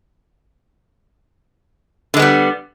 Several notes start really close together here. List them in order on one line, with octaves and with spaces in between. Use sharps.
D3 G#3 B3 G3